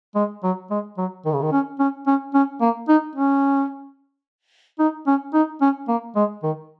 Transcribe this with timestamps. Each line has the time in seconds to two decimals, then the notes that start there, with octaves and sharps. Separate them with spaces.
0.15 G#3
0.43 F#3
0.70 G#3
0.98 F#3
1.25 D#3
1.33 C#3
1.42 D#3
1.52 C#4
1.79 C#4
2.07 C#4
2.34 C#4
2.61 A#3
2.89 D#4
3.16 C#4
4.79 D#4
5.07 C#4
5.34 D#4
5.61 C#4
5.88 A#3
6.16 G#3
6.43 D#3